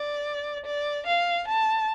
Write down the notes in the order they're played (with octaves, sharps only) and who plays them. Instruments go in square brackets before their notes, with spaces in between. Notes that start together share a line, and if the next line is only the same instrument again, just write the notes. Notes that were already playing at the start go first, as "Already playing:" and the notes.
Already playing: [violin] D5
D5
F5
A5